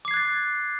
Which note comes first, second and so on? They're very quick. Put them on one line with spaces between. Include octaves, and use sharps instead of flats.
D6 C7 G#6 F#6 A6